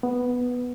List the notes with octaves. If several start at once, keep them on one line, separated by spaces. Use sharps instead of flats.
B3